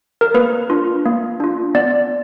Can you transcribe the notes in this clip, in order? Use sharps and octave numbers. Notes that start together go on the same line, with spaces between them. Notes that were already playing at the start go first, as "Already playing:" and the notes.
A#4
A#3 B4
D4 F4
A#3
D4 F4
B3 D5